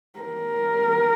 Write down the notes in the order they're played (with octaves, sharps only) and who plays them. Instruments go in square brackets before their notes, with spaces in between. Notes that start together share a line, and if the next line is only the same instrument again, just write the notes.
[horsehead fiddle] A#4